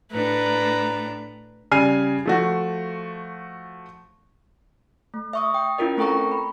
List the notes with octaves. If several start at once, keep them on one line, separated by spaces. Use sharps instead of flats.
A2 D4 B4 A#5
C#3 G3 G#5 F6 C7 D#7
F3 A3 F#4
A3
E5 C#6 D#6
G5
C#4 E4 F4 A#4 D#5
A3 C4 A4 G5 A#5 C#6
B5